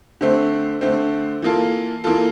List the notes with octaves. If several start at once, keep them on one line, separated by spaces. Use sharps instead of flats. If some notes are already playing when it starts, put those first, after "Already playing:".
D3 A3 C4
D3 A3 C4
E3 A#3 F4 A4
E3 A#3 F4 A4